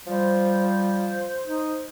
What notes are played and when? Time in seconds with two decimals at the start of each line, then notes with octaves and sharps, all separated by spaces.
0.07 F3 G3 C5
1.45 D#4